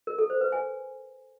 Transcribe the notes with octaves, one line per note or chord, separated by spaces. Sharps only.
A#4
A4
C5
B4
G#5